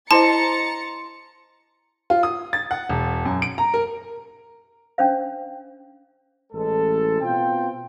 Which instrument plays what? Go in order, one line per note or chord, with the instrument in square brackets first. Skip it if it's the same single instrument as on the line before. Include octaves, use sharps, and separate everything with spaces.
[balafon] E4 C5 D#5 [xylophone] A5 [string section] A#5 A6 C#7 [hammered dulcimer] C6
[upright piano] F4
D#6
A6
F#5
E1
F#2
D7
A#5
A#4
[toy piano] C#4 D4 C5 F5
[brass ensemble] A1 G#3 A4
B2 C4 F4 C5 G5